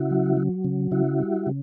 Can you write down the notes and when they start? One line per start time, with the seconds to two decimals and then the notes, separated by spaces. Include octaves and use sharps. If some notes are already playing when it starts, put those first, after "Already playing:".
Already playing: C#3 E4 F#4
0.11 F#3
0.37 F#3
0.64 C#3
0.91 C#3 E4 F#4
1.20 G3
1.46 C#3